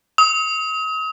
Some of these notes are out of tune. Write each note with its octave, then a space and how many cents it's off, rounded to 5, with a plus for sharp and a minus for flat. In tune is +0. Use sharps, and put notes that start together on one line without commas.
D#6 +40